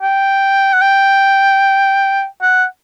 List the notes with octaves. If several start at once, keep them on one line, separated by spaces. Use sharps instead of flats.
G5
F#5
G5
F#5